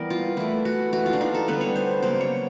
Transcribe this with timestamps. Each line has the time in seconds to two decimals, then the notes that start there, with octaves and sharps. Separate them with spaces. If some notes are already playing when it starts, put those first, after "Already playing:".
Already playing: E3 G3 B3 A#4
0.10 F4
0.37 E3 A3 E4
0.65 F#4
0.92 E3 A3 F#4
1.06 F4
1.13 D4
1.21 D#4
1.35 A4
1.48 D3 G3 B3 B4
1.61 C#5
1.76 C5
2.02 C#3 F#3 A#3 C5
2.21 C#5